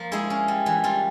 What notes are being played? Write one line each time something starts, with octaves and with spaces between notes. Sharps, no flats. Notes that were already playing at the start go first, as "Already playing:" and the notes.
Already playing: F3 A#3
G#3 E4 G#4
C#4
G3
E3
G3 F4